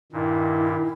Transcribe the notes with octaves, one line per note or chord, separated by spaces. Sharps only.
G2 A#2 D#3 E4